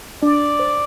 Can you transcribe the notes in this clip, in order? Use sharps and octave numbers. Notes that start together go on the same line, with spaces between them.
D4 D5
C5